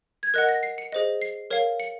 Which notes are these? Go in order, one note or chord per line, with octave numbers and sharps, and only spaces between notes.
G#6
A#4 D#5 F#5 F#6
A#6
C7
C#7
G#4 C5 D#5
C7
A#4 C#5 F5
C#7